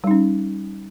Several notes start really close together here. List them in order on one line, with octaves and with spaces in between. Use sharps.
G3 D#4 C#4